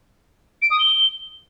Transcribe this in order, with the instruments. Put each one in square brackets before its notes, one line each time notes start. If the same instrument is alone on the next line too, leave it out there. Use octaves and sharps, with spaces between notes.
[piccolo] D7
D#6
G7